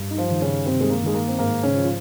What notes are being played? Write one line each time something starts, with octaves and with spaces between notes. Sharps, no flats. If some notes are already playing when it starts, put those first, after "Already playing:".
Already playing: G2
D#4
F3 F4
D#3
C#3 C#4
G2 C3 C4
G#3
A#3
D#3 G#3
A#3
C4
G#2 A#3
C#3 C#4
F3
F4